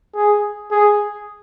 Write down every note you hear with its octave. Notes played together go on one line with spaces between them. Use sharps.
G#4
G#4